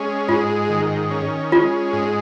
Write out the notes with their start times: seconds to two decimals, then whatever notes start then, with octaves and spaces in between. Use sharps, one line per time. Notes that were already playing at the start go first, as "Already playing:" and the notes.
Already playing: G#3 C#4
0.28 G#2 F4
0.69 D#3
1.11 C#4
1.52 G#3 F4
1.93 G#2